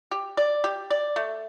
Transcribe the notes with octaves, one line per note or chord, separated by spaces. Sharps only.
G4
D5
G4
D5
A3